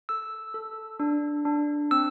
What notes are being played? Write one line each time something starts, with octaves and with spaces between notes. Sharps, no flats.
A4 E6
A4
D4
D4
C4 E6